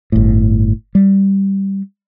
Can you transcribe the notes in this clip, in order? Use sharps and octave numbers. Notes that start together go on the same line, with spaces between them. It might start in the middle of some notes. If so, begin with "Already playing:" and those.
G1 A2
G3